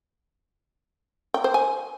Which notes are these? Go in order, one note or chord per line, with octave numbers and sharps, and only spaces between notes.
G5
C5
G#5